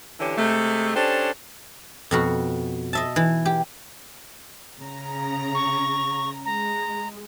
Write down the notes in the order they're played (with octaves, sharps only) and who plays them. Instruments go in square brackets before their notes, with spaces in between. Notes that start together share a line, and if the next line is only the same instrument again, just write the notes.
[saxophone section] D3 E3 C#4 G4
C3 G#3 A3
C#4 D4 G4 A4 C5
[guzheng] F2 B2 F#4
D#5 E5 A5
E3
G4
[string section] C#3 A#5
[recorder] C#6
[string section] G#3 [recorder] A#5